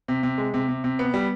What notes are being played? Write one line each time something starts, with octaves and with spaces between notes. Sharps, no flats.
C3
C3
G#3
C3
C3
C3
B3
G3